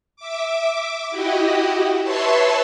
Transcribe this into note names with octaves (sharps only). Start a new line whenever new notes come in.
E5 D6
E4 F#4 G4 D#5
B4 C#5 E5 A5 C6 C#6